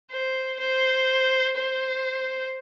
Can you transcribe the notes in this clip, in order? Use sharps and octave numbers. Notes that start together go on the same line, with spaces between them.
C5
C5
C5